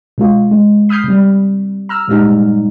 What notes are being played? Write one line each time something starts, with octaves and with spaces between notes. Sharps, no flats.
B2 G#3 F4
G#3
B5 D#6 F6 G6 C7
C3 G3
A#5 E6 F6
G2 A#2 G3 G#3 D#4